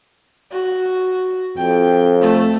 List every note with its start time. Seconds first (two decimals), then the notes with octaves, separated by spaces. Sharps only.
0.52 F#4
1.58 F2 G5
2.21 A3